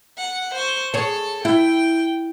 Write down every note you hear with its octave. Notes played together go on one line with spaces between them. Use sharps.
F#5
C5 C#6
G#4 A4 C#5 A5
E4 G5